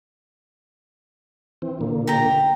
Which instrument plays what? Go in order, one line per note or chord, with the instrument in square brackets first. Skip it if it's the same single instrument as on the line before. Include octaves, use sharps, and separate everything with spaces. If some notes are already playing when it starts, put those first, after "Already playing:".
[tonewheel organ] E3 C4
A#2 D3 A#3
[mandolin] G4 A#5